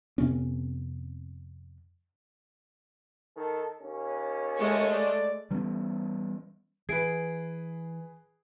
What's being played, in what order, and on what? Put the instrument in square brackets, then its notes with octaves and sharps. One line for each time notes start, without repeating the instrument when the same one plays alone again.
[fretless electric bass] F2 C3 B3 C#4
[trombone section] D#3 A4
D#2 C#4
[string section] G#3 A3 [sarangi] C#5
[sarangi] D5
[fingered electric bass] E3 G3 B3 C#4
[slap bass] E3 [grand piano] G#4 B4 [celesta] G#6 C7 D7